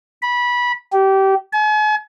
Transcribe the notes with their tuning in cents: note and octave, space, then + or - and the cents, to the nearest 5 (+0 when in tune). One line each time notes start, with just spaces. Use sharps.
B5 -20
G4 -25
G#5 +40